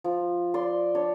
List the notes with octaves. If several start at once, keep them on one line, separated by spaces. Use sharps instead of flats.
F3
D5 C6
D4 C#5